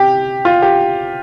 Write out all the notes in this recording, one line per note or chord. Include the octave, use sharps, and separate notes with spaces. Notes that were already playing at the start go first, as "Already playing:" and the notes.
Already playing: C3 G4
F4
G4